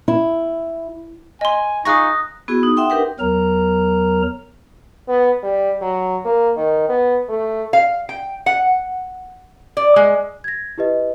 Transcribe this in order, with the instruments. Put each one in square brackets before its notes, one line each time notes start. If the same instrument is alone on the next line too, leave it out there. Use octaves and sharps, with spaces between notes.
[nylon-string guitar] E4
[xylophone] D#5 C6 [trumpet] G#5
[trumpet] D#4 [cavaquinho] F4 G#4 C#6 [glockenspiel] D#6 F#6 A#6
[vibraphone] B3 E4 F#4 G#4
D#4
D#4 E5 F#5 G5 C6 D#6
D4 G4 A#4 B4 F#5 G5
[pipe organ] E2 F#3 A#4 A#5
[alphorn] B3
G3
F#3
A#3
D#3
B3
A3
[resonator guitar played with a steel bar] F5
G5
F#5
D5
G#3
[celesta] G#6 A#6
E4 G4 B4 D#5